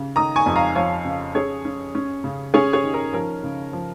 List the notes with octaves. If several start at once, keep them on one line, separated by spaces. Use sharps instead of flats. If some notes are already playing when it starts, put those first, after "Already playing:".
Already playing: C#3
D#3 A#5 D#6
G#5 C#6
F2
F5 A#5
F3 C#5 F5
C#3
C#4 G#4 C#5
C#4
C#4
C#3
C#4 G#4 C#5
G#4 C#5
D#3
A#4
F3 A#4
C#3
F3